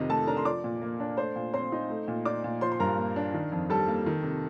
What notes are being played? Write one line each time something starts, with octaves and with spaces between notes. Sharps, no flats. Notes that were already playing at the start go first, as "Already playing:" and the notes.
Already playing: F2 C3 D#3 D#5
A3 A4 A5
D4 A#4 A#5
C6
F3 D5 D6
A#2
A#3
D4
A3 C5 C6
A#2
C4 C5 C6
D#4
A3
A#2
D#4 D5 D6
A#2
F3 C5 C6
C6
G2 A#4 A#5
A#3
D4
D#3
F2
G3 A4 A5
A#3
D#3
C3